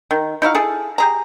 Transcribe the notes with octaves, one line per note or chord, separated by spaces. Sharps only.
D#3
D#4 E4 F#4 F5
E4 G#4 A4
G4 G#4 A#5